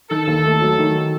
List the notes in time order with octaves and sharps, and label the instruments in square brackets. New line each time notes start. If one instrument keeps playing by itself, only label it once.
[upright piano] D#3 [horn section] A4
[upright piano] D#2
A3
F#3
D#3